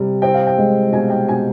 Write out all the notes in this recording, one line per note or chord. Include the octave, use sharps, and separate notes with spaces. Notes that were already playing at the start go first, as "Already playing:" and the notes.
Already playing: C3 G3
C4 G5
F5
G5
G#3
B2 G#5
G5
B2 G#5